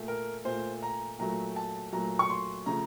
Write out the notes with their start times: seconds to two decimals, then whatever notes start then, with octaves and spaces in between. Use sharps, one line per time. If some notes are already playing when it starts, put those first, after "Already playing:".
Already playing: A#2 A3
0.08 A#4
0.45 A#2 A3 C5
0.82 A#5
1.19 A#2 F#3 A3 A#5
1.56 A5
1.93 A#2 F#3 A3 A#5
2.19 C#6
2.30 C6
2.66 C#3 F3 A3 A#5